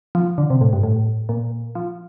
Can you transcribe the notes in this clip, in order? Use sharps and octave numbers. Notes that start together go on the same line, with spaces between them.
F3
D3
C3
A2
G2
A2
A#2
F3